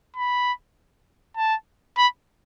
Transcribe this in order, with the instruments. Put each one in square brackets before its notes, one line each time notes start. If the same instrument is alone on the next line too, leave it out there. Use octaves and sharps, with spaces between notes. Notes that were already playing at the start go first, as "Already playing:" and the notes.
[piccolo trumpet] B5
A5
B5